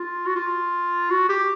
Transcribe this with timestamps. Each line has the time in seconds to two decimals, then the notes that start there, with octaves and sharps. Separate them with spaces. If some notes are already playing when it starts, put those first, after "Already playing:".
Already playing: F4
0.26 F#4
0.35 F4
1.10 F#4
1.29 G4